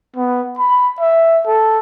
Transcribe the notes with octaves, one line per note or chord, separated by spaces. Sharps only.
B3
B5
E5
A4